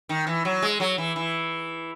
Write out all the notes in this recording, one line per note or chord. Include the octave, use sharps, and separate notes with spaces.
D#3
E3
F#3
G#3
F#3
E3
E3